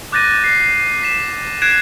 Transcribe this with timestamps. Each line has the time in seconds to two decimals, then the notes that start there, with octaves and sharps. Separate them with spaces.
0.12 D6 F#6 G6 A6 A#6 D#7
0.44 C7
1.03 B6 E7
1.62 F#6 G#6 B6 C7 D7 E7